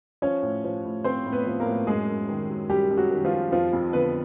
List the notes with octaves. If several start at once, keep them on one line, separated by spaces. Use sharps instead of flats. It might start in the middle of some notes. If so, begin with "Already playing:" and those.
F3 C#4 C#5
A2
F3
A2
F3 C4 C5
A2
B3 B4
F3
A#3 A#4
A2
F#2 G#3 G#4
F#2
D#3
F#3
F#2 G3 G4
F#2
F#3 F#4
D#3
F3 F4
F#3
F2 F3 F4
F2
D3 B3 B4